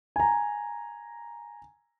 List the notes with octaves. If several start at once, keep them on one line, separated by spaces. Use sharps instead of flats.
G#5 A#5